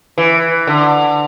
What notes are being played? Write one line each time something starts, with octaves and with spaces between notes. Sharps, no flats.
E3
D3